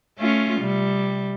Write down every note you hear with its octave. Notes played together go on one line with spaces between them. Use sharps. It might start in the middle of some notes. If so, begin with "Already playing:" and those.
A3 C#4 F4
C3 G3